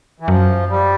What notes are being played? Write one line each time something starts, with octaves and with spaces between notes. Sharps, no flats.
E3
F#2 F3
G3